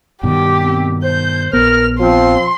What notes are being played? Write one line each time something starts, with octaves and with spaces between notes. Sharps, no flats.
G2 B2 D#3 G4
C4
C5 G6
A#1 B3 A#4 F6
F3 C4 C6